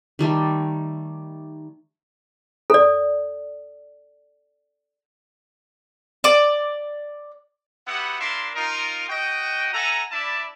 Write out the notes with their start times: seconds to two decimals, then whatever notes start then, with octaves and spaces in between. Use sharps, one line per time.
0.19 D#3 G3 A3
2.70 A4 D5
6.24 D5 D6
7.88 B3 E4 F#4 G4 F#5
8.20 D4 E4 F4 A#4 E5 C6
8.55 D#4 F4 A#4
9.08 F#4 D#5 G5
9.73 A4 E5 F#5 G#5 A#5
10.12 D4 E4 D5 E5 A5 B5